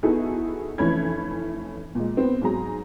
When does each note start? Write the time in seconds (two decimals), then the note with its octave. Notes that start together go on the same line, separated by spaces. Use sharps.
0.03 B3 D#4 E4 F#4 G#4 A4
0.78 F1 E3 A3 C#4 B5 G#6
1.95 A#2 G#3
2.17 B3 C4
2.42 G#2 F#3 G#4 A#5